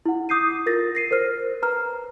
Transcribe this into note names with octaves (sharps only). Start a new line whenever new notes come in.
E4 F#5
D6 D#6 G6 C7 D#7
F4 A#4 A6 A#6
A#6 C7 D#7
A#4 C5 F6
B4 A#5 F6